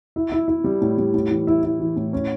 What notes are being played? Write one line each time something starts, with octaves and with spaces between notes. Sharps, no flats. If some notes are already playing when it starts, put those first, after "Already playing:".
E4
E4
E4
G3
A2
G3
A2
E3
E4
E4
E3
A2
C#4